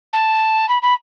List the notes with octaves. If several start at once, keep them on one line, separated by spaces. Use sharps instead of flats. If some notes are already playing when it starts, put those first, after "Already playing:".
A5
B5
B5